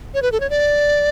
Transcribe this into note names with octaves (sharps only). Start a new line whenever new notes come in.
C#5
B4
A4
C#5
D5